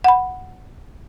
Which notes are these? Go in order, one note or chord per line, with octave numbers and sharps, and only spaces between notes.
F#5 B5